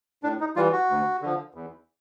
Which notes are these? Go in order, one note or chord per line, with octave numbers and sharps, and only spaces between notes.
A2 D4
D#4
E3 G3 F4
F#4
D2
D3 F3
E2